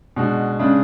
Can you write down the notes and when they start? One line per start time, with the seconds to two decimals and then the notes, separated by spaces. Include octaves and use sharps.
0.16 B2 G#3 D4 F#4
0.59 C#3 G#3 D4